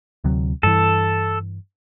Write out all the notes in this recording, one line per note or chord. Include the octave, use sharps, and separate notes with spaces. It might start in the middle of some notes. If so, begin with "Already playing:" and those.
D2 C3 F#3
G2 E3 A4